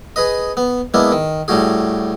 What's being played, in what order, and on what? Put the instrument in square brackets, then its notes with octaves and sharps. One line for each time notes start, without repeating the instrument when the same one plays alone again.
[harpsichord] G#4 B4 D#5
B3
G#3 A#3 B3 D4 E4
D#3
A2 G3 A3 F#4 G#4